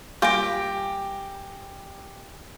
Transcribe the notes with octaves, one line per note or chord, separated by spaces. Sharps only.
G3 A#3 F4 G4 G5 G#5 A#6